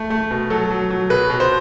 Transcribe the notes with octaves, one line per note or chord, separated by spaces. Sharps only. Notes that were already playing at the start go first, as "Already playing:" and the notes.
Already playing: A3
A3
B2
F#3 A4
F#3
F#3
B2 B4
B2
C5